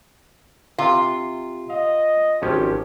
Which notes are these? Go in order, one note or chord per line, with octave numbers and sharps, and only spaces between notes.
C3 F4
D#5 F5
G#1 F3 C#4 G4